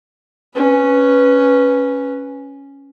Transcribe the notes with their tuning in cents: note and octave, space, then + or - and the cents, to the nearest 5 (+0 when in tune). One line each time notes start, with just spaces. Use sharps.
C#4 +0 B4 +0